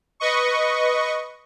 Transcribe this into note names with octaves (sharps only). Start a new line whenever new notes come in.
B4 D#5 C#6